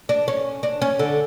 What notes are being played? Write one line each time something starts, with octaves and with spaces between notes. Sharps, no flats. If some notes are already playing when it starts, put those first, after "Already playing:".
D4
C#4
D4
C#4
D3